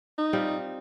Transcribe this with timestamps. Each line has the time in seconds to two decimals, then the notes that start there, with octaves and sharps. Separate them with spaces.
0.18 D#4
0.33 G3 C4 F4